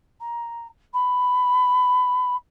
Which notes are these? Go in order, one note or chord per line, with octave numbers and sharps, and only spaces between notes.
A#5
B5